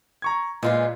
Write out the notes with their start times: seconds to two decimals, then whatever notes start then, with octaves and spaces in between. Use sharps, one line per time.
0.22 A#5 C#6 G#6
0.63 A#2 G#3 F4 B4